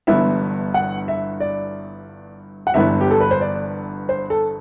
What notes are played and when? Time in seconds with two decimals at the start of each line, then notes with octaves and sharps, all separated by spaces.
0.07 G1 G2 E3 B3 E4 E5
0.74 F#5
1.08 E5
1.40 D5
2.67 F#5
2.74 G1 G2 E3 B3 E5
3.01 G4
3.11 A4
3.21 B4
3.31 C5
3.41 D5
4.09 C5
4.30 A4